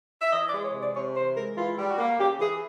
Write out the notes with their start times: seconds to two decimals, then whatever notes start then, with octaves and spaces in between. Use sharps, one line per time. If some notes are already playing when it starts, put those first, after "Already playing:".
0.22 E5
0.32 E3 D#5
0.48 D5
0.53 G#3
0.64 C#5
0.74 C3
0.79 D5
0.95 C3 C#5
1.15 E3 C5
1.36 G#3 A#4
1.56 E3 F4
1.78 G3
1.88 F#4
1.98 A#3
2.19 C#3 G4
2.40 E3 G#4